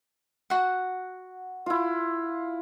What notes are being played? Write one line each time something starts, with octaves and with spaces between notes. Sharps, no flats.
F#4 F#5
E4 F4